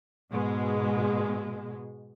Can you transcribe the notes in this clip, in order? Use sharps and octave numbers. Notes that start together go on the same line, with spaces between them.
G#2 B2 G#3